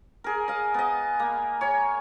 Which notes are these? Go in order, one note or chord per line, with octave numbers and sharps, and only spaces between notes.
G#4 A#4
D#5 F5
B3 D#5
A#3
C#5 G#5